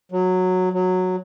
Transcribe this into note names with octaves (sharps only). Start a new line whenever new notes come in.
F#3
F#3